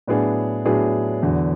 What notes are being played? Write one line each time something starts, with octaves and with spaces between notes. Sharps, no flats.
A2 F#3 B3 D4 G#4
A2 F#3 B3 D4 G#4
E2 D3 F#3